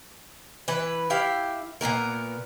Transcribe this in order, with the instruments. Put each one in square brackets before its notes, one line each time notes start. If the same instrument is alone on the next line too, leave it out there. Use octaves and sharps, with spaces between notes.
[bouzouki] E3 B4
E4 G4 F5
A#2 C#3 B3 A#4